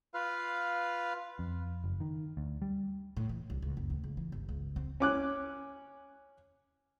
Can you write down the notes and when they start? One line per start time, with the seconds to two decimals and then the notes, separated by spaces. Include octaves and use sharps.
0.14 F4 B4 F5
1.39 F2
1.84 F#1
2.00 D#3
2.37 D2
2.62 G3
3.17 A2
3.29 E3
3.50 C2
3.62 C#2
3.77 F#1
3.90 D2
4.04 C#2
4.17 E3
4.32 G1
4.49 C#2
4.76 C4
5.00 C#4 D6 F#6